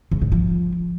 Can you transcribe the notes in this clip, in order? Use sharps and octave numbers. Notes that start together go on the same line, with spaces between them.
C#3
G#2
F3